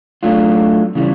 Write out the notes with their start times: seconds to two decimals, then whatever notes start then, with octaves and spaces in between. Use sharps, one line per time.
0.23 F#3 A3 D4 F4
0.95 C#3 E3 G3